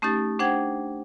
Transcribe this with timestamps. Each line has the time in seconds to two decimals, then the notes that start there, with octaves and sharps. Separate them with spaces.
0.02 A3 C#4 D#4 G4 A6
0.39 D4 C5 F#5 G5 G#6